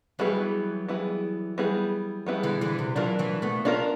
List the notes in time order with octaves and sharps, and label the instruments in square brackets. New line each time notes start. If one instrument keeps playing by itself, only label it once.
[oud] E3 F#3 [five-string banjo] G3 B3 E4 G#4
[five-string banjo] G3 B3 E4 G#4
G3 B3 E4 G#4
G3 B3 E4 G#4
[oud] D3 E3
D3 E3
C3
[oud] E3 F#3 [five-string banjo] D4 F4 A#4
[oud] E3 F#3
A3 B3
[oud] B3 C#4 [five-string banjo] D4 F4 A#4